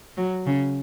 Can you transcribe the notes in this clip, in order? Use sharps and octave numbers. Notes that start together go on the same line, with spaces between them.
F#3
C#3